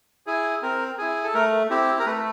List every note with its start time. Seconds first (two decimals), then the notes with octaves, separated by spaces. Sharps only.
0.27 E4 G#4
0.62 C4 A#4
0.98 E4 G#4
1.24 A4
1.34 A3 A#4
1.70 C4 E4 G4
1.99 A#4
2.06 A3 B4